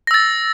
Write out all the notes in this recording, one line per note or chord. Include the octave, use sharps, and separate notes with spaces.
E6 A6 A#6